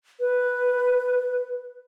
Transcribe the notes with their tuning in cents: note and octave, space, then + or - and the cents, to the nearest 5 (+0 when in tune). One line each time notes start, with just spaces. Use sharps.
B4 +0